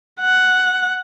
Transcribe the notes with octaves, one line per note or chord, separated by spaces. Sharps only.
F#5